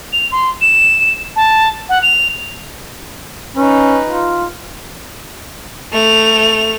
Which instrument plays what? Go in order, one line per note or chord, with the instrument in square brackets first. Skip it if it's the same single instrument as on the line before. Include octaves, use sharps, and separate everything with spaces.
[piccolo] F7
C6
E7
A5
F#5
F7
[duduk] C#4 [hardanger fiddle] D#4 B4
[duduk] F4
[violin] A3 F7